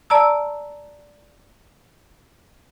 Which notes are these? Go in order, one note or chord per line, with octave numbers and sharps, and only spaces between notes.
D5 A5 A#5 E6